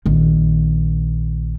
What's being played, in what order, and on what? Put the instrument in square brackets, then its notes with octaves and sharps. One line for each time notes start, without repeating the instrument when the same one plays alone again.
[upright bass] A#1 D#3